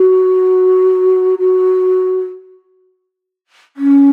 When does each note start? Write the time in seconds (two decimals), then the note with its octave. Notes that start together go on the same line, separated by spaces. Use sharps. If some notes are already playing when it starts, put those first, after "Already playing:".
Already playing: F#4
1.39 F#4
3.77 C#4